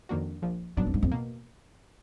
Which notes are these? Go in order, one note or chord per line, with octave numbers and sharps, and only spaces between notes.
F2 D#3 A#3 D4 F#4
A#1 A#2 F3
B1 F#2 A#2 F#3 B3 D4
F2
G#2
F2
B2 A#3